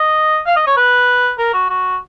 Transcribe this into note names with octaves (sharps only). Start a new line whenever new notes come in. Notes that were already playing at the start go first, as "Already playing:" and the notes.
Already playing: D#5
F5
D#5
C#5
B4
A#4
F#4
F#4